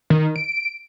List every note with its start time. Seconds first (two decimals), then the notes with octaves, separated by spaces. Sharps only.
0.10 D#3
0.36 D7